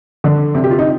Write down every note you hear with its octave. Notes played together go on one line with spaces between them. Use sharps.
D3 D4
C3 C4
G4
F4
D#4